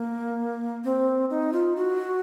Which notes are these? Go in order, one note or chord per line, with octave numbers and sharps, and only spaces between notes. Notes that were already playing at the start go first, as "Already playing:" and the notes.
Already playing: A#3
C4
D#4
F4
F#4